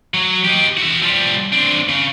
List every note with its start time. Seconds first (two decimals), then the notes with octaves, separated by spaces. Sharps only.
0.14 F#3
0.44 D#4 G4
0.77 F#4 E5
1.02 F3 G3
1.52 C4 D4
1.89 C#3